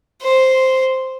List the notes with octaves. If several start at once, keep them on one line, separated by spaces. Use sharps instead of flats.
C5